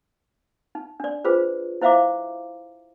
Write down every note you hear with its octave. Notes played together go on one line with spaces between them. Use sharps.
D#4
D4 D5
F4 G#4 B4 C5
E4 C5 E5 F5 A#5 D6